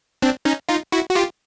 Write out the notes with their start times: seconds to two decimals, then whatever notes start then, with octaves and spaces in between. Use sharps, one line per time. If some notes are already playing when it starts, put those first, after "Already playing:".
0.22 C4 D4
0.45 C#4 D#4
0.69 D#4 F4
0.92 E4 F#4
1.10 F#4
1.15 F4 G4